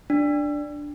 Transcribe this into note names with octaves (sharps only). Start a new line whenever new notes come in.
D4